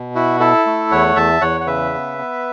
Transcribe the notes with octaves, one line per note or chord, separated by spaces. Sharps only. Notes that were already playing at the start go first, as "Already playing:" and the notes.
Already playing: B2
E4 F#4
E4 A4
A3
E2 C#5 F#5
E2 E5 A5
E2 C#5 F#5
F#5
C#3 B4 E5
B3
B3